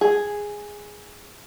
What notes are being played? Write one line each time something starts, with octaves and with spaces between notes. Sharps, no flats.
G#4